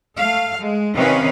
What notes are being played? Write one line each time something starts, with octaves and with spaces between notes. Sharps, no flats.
A3 F5
G#3
C3 D#3 C4 C#4 B4 F5